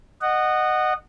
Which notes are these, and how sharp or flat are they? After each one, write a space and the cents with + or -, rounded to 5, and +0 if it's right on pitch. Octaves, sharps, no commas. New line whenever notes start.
D#5 -20 F#5 +5